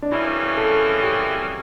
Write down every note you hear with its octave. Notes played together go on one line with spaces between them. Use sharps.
D4
F#2 C#3 E3 G3 C#4 E4
A4
G4